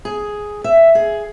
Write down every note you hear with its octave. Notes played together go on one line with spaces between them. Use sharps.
G#4
E5
G#4